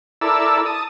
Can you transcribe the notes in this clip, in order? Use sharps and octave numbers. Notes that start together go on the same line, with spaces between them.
E4 A4 A#4 D5 E6
A5 D#6